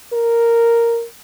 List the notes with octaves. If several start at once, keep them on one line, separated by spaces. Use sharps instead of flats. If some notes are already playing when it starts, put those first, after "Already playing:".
A#4